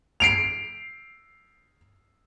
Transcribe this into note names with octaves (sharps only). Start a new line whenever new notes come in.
C7 D7 F7